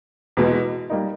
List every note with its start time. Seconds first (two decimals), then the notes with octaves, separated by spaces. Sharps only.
0.37 E2 B2 G#3
0.90 G3 A#3 D#4